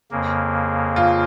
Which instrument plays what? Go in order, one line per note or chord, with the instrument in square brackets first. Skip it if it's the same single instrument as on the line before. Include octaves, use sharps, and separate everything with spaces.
[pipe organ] F2 C#3 A#3
[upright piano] F4